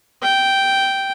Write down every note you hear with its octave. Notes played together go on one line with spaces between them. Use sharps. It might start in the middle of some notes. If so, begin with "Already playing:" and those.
G5